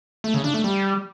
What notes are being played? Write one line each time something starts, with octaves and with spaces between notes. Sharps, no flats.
A3
C#3
D4
A3
G3